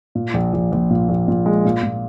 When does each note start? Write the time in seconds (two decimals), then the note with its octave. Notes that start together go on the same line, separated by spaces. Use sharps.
0.15 A#2
0.34 A#1
0.53 A#1
0.72 A#1
0.90 A#2
1.09 A#1
1.28 A#2
1.46 G#3
1.65 A#2
1.83 A#2